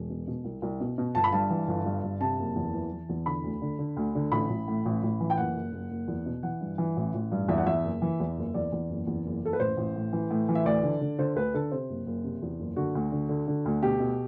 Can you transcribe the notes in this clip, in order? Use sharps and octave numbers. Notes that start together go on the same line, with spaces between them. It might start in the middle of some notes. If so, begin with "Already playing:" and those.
Already playing: E1
B2
B2
C2
C2
B2
B2
G1 A5
B5
G2 A5
E3
G1
G2
G1
C3 A5
F#1
E2
E3
E3
E2
D3 B5
D2
D3
D3
D2
D3
A1 B5
A1
A2
A1
A1
E3
G5
F#1 F#5
F#1
F#1
F#1
E2
B2
E3 F#5
G2
E3
A1
A1
G2
E2 E5
F#5
E2 E5
F#1
E3
E2
F#1
E2 D5
E2
F#1
E2
F#1
F#1 A4
B4
A1 C5
A1
A2
E3
A2
E3
E5
D2 D5
D3
D3
D3 C5
D2 B4
D3 A4
C3 C5
F#1
F#1
C3
E2
F#1
D3 F#4
D2
D3
D3
D3
D2
B2 G4
B2